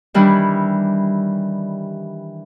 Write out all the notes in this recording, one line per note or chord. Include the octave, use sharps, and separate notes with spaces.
D#3 E3 G3 D4 E4